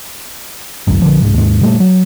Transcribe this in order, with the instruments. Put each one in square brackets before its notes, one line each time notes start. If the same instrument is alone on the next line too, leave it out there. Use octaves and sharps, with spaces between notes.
[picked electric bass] G#1 C#2 F#2
A#1 D3 F3
C2 G#2
D#2 G#2
A#2 G3 A3
F#3